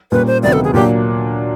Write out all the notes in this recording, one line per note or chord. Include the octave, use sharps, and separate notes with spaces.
A#2 G3 A#3 C#4 B4
C5
D2 C3 D#3 F#3 B3 D5
A4
G#4
A#2 F#3 A#3 D4 G4